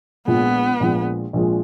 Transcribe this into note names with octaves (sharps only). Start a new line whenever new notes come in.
A#1 A#2 F3 G#3 B3
A#1 A#2 F3 G#3
A#1 A#2 F3 G#3